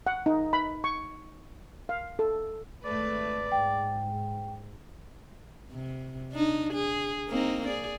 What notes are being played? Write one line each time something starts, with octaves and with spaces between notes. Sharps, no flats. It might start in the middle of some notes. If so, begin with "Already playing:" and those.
F#5
D#4
B5
C#6
F5
A4
G#1 A3 B4 D5
G#2 G5
C3
D4 D#4
G#4
A#3 C4 D#4
G#4 D5